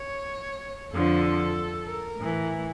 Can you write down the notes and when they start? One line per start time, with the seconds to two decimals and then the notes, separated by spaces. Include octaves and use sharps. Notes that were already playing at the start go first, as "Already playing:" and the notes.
Already playing: C#5
0.93 F2 D3 F3 A4
1.86 A#4
2.17 A2 E3